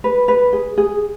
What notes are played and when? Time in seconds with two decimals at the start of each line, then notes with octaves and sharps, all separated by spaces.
0.04 B4
0.28 B4
0.53 G#4
0.77 G#4